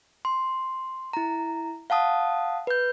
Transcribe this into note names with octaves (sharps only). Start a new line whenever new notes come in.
C6
E4 A#5
F5 F#5 A5 D#6
B4 G6